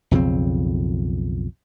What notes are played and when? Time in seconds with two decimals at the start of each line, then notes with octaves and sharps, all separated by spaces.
0.11 B1 F2 C#3 C4